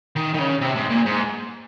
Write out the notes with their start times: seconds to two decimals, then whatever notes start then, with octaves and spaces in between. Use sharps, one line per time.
0.16 D#3
0.34 D#3
0.39 C#3
0.61 C3
0.76 G#2
0.90 A#2
1.06 G#2